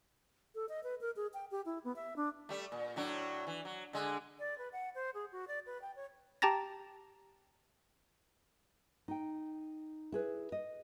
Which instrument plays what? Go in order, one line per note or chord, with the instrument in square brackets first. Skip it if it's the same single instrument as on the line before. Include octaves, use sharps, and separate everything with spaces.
[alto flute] A4
D#5
B4
A#4
G#4
G5
G4
E4
B3
E5
D4
[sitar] G3 A3
A#2
A2 F#3 D4
E3
F#3
D3 G#3
[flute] D5
B4
F#5
C5
G#4
F#4
D5
B4
G5
C#5
[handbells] G4 G5 A5 A#5 A6 A#6
[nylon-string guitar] D#4 G5
E4 G#4 B4
D#5